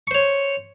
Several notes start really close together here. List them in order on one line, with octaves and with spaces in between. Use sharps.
C#6 C5 C#5